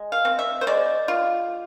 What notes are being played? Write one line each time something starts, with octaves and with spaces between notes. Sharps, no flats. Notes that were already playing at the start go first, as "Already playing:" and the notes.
Already playing: G#3
F5
C4
E5
C5
G#3 D5
F4